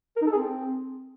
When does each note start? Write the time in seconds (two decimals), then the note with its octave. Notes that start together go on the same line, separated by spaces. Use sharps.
0.17 A#4
0.22 D#4
0.27 A4
0.32 G#4
0.37 C4